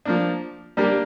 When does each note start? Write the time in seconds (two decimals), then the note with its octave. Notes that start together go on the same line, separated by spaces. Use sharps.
0.05 F3 A#3 D4
0.77 G3 A#3 D4 G4 A#4